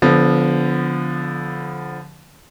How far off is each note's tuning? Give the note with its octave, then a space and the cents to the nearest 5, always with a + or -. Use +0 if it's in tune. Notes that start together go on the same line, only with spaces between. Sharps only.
D3 -25 F3 +0 B3 +0